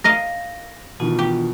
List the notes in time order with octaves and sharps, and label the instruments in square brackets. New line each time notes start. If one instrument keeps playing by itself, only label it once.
[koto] A#4 D#5 F5 [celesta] A#6
[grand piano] B2 D#3 E3 [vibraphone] B3 D4 F4
[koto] G4